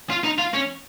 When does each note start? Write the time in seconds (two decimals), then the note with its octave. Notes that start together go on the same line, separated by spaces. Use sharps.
0.10 F4
0.24 D#4
0.38 F4
0.54 C#4